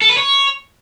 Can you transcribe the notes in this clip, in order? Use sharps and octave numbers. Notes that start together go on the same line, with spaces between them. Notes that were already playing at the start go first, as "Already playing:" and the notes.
A4
B4
C#5